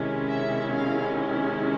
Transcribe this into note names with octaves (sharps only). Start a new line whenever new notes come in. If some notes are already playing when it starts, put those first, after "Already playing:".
Already playing: C3 D#3 G#3 C#4 E4
E5
F5